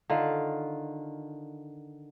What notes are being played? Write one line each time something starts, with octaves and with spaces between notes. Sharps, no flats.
D3 D#3 F4